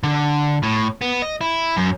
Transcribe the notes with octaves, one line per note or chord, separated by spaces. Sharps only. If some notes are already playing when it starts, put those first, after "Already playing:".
D3
A2
B3
D#5
E4
F#2